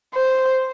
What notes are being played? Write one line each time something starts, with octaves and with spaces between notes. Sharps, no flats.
C5